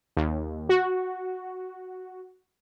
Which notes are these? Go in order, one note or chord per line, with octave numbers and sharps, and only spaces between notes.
D#2
F#4